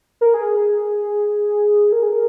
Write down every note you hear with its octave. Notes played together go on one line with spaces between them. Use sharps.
A#4
G#4
A#4
G#4
A#4